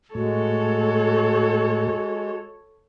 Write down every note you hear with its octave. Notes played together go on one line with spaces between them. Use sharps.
A2 G#3 A3 F#4 A4 C#5